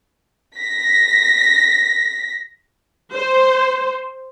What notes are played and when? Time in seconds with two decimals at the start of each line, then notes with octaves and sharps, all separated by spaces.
0.56 A#6 B6
3.13 C5